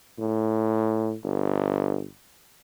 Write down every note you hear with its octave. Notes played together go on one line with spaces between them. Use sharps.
A2
G1